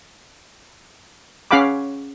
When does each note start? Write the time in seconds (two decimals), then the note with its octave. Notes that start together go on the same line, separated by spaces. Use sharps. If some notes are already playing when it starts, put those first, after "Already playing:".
1.51 C#4 G#4 F5 F#5 B5 D6